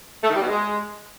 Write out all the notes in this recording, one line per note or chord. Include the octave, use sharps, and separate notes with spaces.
A3
D#3
G3
B2
G#3